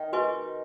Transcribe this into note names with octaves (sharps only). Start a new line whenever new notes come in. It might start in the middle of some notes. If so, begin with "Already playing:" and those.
Already playing: D#3
F#4 B4 D#5 G#5 C#6